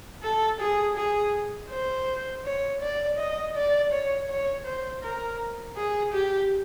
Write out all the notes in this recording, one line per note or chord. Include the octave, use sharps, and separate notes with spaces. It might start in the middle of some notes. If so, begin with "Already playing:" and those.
A4
G#4
G#4
C5
C#5
D5
D#5
D5
C#5
C#5
C5
A#4
G#4
G4